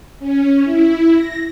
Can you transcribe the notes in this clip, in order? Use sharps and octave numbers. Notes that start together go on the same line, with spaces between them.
C#4
E4
A#6